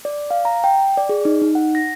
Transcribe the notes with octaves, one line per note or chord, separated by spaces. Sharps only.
D5
F5
A#5
G5
D5
G#4
D#4
D#4
F#5
A#6